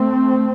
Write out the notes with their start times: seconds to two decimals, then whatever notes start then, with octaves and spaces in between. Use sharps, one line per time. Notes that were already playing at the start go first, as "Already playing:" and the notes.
Already playing: A3 C4